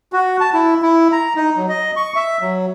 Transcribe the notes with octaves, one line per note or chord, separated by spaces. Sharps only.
F#4
A5
E4
E4
A#5
D#4
F#3
D#5
C#6
E5
F#3